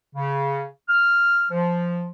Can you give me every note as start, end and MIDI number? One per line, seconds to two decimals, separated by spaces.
0.15 0.65 49
0.89 1.44 89
1.51 2.07 53